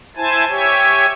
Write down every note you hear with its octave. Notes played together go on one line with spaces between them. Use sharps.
E4 C5 G#5 A5
G4 C#5 E5 G#5